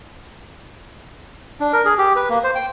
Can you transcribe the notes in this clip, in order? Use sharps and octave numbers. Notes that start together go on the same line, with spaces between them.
D4
A#4
G#4
G4
B4
A#3
C5
G5